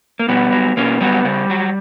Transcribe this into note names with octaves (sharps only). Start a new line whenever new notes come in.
A#3
B2 G3 B3
F#3
B2 A#3 C#4
F#3 G3 B3
C#3 G3
F#3